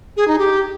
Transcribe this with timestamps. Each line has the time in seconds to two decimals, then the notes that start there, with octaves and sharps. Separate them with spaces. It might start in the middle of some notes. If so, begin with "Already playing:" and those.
0.16 G#4
0.27 D#4
0.38 G4